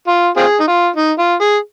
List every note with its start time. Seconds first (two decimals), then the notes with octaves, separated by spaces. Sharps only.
0.07 F4
0.37 C4 F4 G#4
0.60 D#4
0.67 F4
0.96 D#4
1.19 F4
1.41 G#4